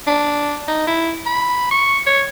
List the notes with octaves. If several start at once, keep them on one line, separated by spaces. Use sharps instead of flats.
D4
D#4
E4
B5
C#6
C#5